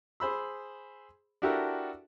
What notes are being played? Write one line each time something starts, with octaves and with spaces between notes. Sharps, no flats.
G#4 C5 B5 E6
D4 E4 F#4 G4 A4 A#4